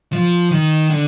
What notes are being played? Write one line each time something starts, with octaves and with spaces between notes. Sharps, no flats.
F3
D#3
D3